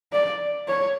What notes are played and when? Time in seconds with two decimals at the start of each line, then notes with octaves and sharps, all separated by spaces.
0.13 D5
0.68 C#5